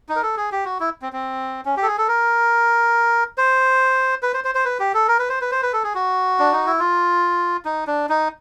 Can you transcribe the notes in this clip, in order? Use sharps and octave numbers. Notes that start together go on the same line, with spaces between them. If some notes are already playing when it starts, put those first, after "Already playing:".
D#4
A#4
A4
G#4
G4
F#4
E4
C4
C4
C#4
G4
A4
G#4
A4
A#4
C5
B4
C5
C5
C5
B4
G4
A4
A#4
B4
C5
B4
C5
B4
A4
G#4
F#4
D4
D#4
E4
F4
D#4
D4
D#4